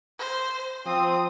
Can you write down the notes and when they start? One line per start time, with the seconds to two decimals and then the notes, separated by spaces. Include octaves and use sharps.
0.19 C5
0.86 F3 C4 D#6